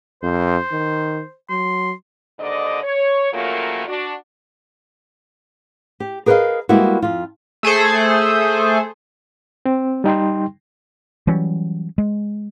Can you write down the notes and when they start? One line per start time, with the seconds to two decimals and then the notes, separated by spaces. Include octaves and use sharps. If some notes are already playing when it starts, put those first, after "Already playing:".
0.23 F2 C5
0.72 D#3
1.50 F#3 C6
2.39 D#2 G#2 D3 D5 D#5
2.83 C#5
3.33 A#2 C#3 F3 F#3 A3 A#3
3.88 D4 F#4
6.00 G4
6.26 G#4 A#4 B4 C#5 D#5 F5
6.69 G3 G#3 A#3 B3 E4 F#4
7.02 F2 F4
7.63 A3 G#4 A4 C5
9.66 C4
10.04 G3 D#4 G5 C6
11.27 E3 F#3 G3 C#4
11.98 G#3